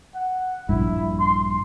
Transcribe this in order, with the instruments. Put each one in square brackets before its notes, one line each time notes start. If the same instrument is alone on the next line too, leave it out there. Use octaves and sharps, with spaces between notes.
[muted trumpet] F#5
[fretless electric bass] A#1 G2 [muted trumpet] E4
[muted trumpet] C6